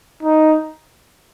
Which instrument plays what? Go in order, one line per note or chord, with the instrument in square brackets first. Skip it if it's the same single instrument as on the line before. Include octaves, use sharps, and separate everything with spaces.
[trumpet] D#4